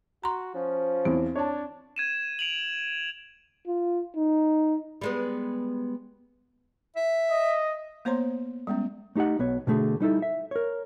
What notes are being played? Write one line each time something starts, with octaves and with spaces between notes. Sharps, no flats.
F#4 A#5 C6
F3 C#4
E2 C4
D4 C#5 A5
G#6 D#7 E7
D7 F7 F#7
F4
D#4
G3 G#3 B3
E5
D#5
A#3 B3 C5 C#5 A#5 C6
G3 G#3 B3 C#4
A3 D#4 G4 D#5 F#5
B1 B3 C#5
B2 D3 A3 G#4
G3 D#4 E4 A4
E5
A#4 C#5